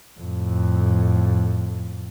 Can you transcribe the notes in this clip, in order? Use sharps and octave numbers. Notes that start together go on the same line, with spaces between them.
F2 A2